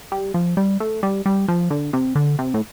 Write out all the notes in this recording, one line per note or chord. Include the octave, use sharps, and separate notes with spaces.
G3
F3
G3
A3
G3
G3
F3
D3
C3
D3
C3
A2